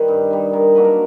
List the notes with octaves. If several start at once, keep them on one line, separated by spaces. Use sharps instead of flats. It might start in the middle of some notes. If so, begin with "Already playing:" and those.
Already playing: D#3 G3 B4
G2
D#3 G3
D#3 A#4
F#3 A#3 D4 B4
A#4